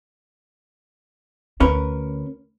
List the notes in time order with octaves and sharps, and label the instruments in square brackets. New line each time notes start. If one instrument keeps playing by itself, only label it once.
[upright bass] D2 [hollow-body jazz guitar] C#4 A#4 B4